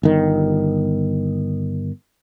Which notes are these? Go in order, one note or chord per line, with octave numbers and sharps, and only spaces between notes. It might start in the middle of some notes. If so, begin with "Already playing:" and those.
G1 D#3